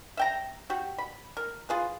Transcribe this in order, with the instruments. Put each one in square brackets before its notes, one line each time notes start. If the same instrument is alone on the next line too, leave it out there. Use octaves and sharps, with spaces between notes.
[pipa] E5 G5 A#5
F#4 G4
B5
A#4
F4 G#4 B4